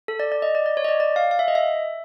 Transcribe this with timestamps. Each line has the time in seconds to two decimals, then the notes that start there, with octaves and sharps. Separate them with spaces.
0.08 A4
0.20 D5
0.32 D5
0.42 D#5
0.55 D5
0.66 D5
0.77 C#5
0.84 D#5
0.89 D5
1.00 D5
1.16 F5
1.31 F5
1.39 E5
1.48 D#5
1.55 E5